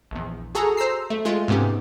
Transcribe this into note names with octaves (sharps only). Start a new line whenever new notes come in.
A#1 E2
F#4 G#4 A4 A#5
C5 A#5 E6 C7
A3
G#3 A3 F4
G#2 C3 B3 C#4 G4